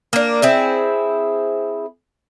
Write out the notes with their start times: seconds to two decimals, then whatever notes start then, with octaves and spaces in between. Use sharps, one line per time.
0.13 A#3 D4
0.42 C4 E4 G#4